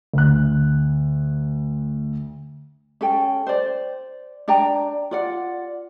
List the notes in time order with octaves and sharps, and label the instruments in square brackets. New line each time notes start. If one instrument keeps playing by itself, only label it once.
[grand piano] D2 F#6
[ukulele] C#4 A4 G5
C5 D5
D4 D5 G5 A#5
F4 D5 F#5